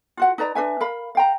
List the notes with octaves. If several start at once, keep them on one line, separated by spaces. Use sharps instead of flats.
F4 F#4 F#5
D#4 B4 D5 A#5
D4 B4 E5 G#5
A#4 F5 B5
F5 G5 A#5